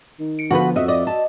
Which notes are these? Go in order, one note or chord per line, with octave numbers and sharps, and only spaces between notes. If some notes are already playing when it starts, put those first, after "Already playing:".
D#3
C#7 D7
D3 F3 B3 F#4 B4
F2 F#4 D#5 E5
D5 D#5
A5